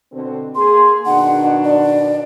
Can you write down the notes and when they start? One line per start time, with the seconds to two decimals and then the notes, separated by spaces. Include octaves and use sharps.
0.12 B2 D3 C4
0.55 A#3 G#4 C6
1.06 B2 D#3 D4 F#5
1.64 D5